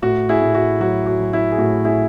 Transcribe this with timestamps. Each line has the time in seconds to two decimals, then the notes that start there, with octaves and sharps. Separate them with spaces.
0.02 A2 F#4
0.29 E4 G#4
0.42 A2
0.55 F#4
0.80 F#3 F#4
1.06 F#4
1.20 F#3
1.33 E4
1.51 G#4
1.58 A2 F#4
1.85 E4 G#4